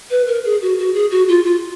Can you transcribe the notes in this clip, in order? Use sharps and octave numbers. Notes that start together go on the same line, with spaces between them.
B4
A#4
G#4
F#4
F#4
G#4
F#4
F4
F4